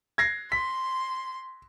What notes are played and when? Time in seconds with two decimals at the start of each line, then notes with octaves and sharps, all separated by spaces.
0.18 G#6 A#6 C7
0.52 C6 B6